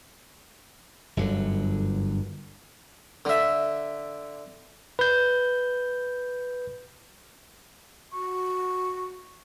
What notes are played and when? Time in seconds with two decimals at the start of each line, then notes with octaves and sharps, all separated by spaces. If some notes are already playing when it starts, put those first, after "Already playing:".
1.17 G1 F#2 D3
3.25 D3 E5
4.99 B4 G6
8.13 F#4 C#6